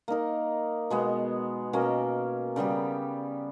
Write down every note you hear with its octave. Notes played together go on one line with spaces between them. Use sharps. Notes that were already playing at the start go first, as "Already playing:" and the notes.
A#3 D#4 A#4
B2 G#3 B3
B2 A#3 C#4
C#3 G3 B3 G4